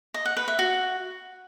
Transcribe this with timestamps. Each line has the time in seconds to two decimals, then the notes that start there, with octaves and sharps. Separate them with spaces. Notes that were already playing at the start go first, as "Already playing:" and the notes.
0.14 D#5
0.25 F#5
0.37 B4
0.48 E5
0.59 F#4